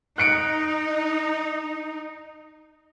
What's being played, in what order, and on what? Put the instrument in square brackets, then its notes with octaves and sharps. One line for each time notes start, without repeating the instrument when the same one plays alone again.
[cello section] D#4 [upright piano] F#6 C#7 D7